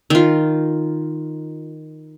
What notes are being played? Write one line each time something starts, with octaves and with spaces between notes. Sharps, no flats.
D#3 F4